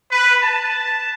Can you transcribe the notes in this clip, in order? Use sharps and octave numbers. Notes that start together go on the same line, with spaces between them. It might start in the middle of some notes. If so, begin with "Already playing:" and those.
B4
A5